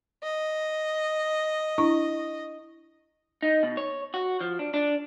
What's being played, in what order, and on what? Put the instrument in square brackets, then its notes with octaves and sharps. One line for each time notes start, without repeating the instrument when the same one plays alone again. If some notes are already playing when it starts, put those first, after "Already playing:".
[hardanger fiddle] D#5
[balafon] D4 E4 C#6
[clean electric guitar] D#4
B2
C#5
F#4
F3
D4
D4